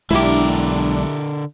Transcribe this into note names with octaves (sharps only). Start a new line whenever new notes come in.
B1 D3 G#3 D4 E4 G4 A#4